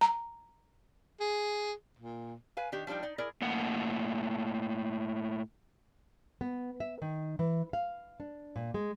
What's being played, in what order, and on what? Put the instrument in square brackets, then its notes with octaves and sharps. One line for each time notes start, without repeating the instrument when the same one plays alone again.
[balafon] A#5
[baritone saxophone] G#4
A#2
[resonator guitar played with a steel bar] B4 F5 G#5
D#3 D4 G4
F3 G3 D4 D#4 G5
D#4 D5
E4 G#4 A#4 D5
[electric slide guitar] A2 A#3 F#5
[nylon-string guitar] B3
E5
D#3
E3
F5
D4
A#2
G#3